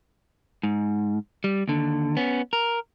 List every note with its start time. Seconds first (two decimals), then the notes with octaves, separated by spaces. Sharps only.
0.63 G#2
1.44 G3
1.68 D#2 D3
2.17 B3 C#4
2.53 A#4